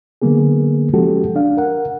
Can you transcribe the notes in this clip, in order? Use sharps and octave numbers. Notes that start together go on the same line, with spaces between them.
D3 F#3 A#3 B3 G#4
F3 G#3 C#4 F#4 G4 A4
D4 F5
A#4 F#5